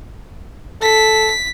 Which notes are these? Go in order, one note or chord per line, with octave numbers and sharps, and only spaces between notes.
A4 B6